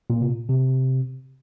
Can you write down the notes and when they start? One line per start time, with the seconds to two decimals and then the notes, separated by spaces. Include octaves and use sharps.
0.10 A#2
0.21 C3
0.49 C3